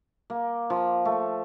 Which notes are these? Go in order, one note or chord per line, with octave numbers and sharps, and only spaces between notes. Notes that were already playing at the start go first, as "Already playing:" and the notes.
A#3
F3
A3